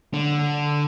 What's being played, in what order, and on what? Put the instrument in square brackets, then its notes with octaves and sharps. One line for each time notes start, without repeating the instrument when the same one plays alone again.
[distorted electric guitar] D3